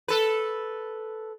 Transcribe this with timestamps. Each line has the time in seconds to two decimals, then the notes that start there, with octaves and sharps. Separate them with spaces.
0.08 A4 B4